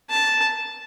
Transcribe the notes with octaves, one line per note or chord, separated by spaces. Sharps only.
A5